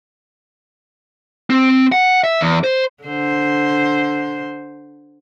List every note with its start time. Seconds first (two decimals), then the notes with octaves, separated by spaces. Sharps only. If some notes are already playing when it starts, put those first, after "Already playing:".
1.50 C4
1.92 F#5
2.24 E5
2.41 E2
2.64 C5
3.04 D3 C5